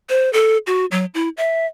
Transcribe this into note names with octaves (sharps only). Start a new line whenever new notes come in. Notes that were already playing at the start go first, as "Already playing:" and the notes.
C5
A4
F#4
F#3
E4
E5